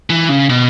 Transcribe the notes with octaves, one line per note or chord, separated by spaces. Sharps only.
E3
C#3
B2